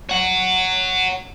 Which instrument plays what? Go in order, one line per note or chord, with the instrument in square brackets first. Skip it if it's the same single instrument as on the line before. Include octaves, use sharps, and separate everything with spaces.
[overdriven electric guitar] C#5 F#5